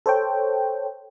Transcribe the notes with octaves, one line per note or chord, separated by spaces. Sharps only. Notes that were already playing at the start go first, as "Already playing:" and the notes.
A4 C5 C#5 G5